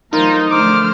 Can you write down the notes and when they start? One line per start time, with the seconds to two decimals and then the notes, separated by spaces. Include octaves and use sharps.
0.13 E2 F#3 A3 D#4 F4 A#4 C5
0.51 D3 F3 A3 C5 D6 F6